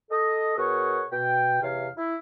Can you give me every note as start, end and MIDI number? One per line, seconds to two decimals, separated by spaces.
0.10 0.55 69
0.10 0.55 75
0.56 1.03 47
0.56 1.03 68
0.56 1.03 70
0.56 1.03 73
0.56 1.03 78
1.12 1.60 47
1.12 1.60 79
1.62 1.89 40
1.62 1.89 48
1.62 1.89 73
1.62 1.89 77
1.97 2.16 64